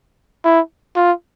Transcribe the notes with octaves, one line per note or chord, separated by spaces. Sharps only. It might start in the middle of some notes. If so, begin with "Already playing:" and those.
E4
F4